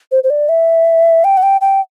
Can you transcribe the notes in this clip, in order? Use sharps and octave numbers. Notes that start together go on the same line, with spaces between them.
C5
C5
D5
E5
G5
F#5
G5
G5